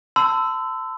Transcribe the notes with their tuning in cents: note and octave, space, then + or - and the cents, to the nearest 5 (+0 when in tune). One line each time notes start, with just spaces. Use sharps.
A5 +25 C6 -40 E6 +0